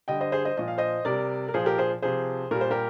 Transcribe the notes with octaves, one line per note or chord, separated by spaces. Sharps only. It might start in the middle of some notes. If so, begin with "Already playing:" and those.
D3 G3 D#5 G5
C5 D#5
G#4 C5
C5 D#5
A#2 F3 D#5
F5
C5 D#5
C3 G3 A#4 D5
A#4
A#2 F3 G#4 C5
G4 A#4
G#4 C5
C3 F3 G#4 C5
A#2 G3 A#4
C5
G4 A#4